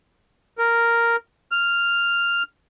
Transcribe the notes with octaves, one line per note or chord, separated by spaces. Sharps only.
A#4
F6